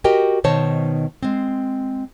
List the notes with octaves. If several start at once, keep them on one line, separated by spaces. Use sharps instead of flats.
F#4 G4 A#4 D#5 G5
B2 D#3 C5 C#5 A5
G#3 C4